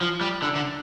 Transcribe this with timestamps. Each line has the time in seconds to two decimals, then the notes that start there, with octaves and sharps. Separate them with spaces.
0.01 F3
0.21 G3
0.42 D3
0.55 D3